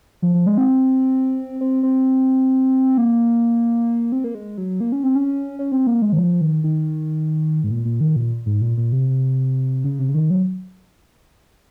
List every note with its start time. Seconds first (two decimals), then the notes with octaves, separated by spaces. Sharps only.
0.22 F3
0.34 F3
0.46 G#3
0.58 C4
1.61 C4
1.83 C4
2.98 A#3
4.12 C4
4.24 A#3
4.35 G#3
4.58 F#3
4.80 A#3
4.92 C#4
5.04 C4
5.15 C#4
5.59 C#4
5.72 C4
5.87 A#3
6.02 G#3
6.13 D#3
6.18 F3
6.41 D#3
6.64 D#3
7.64 G#2
7.71 A#2
7.85 A#2
8.01 D#3
8.16 A#2
8.46 G#2
8.61 A#2
8.78 A#2
8.92 C3
9.84 C#3
9.99 C3
10.09 C#3
10.14 D#3
10.30 F#3